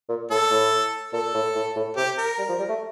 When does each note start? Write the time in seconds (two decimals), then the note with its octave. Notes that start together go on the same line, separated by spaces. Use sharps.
0.09 A#2
0.30 A2 A4
0.51 A2
1.13 A#2 A4
1.34 A2
1.55 A2
1.76 A2
1.96 C3 G4
2.18 A#4
2.38 G3
2.49 F3
2.59 G3
2.69 A3